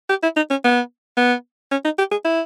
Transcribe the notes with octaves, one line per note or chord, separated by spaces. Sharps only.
G4
E4
D#4
C#4
B3
B3
C#4
D#4
G4
G#4
E4